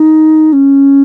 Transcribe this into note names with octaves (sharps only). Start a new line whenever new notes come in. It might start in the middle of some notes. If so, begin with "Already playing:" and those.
Already playing: D#4
C#4